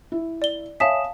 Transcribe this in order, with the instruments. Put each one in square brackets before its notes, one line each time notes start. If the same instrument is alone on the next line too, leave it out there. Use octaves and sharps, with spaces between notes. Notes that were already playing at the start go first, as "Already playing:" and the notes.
[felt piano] E4
[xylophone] D5 G7
[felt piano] C#5 E5 [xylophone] F5 A5 B6 [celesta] G#5 D#6 E7